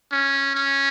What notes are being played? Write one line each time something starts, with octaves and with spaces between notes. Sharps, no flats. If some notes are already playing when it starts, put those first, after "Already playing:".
C#4
C#4